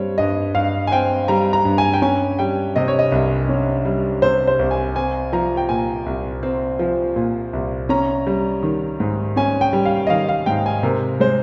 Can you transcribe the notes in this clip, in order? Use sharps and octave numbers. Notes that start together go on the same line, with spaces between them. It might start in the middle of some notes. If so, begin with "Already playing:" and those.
Already playing: G2 G3 C4 C#5
G2 D#5
G2 F5
G#5
C4 G5
G3 A#5
A#5
G2
G#5
G5
C#4 G#5
G3 G5
C3 D#5
C#5
D#5
C2
C#4
G3
C3 C5
C5
C2
G#5
C4 G#5
F3 A#5
G5
A#2 G#5
C2
C4
F3
A#2
C2
C#4 A#5
G3
D#3
G#2
C#4 G#5
G5
G3
F5
D#5
D#3 F5
F5
G#2 G5
G#5
C3 A#4
G#3 C5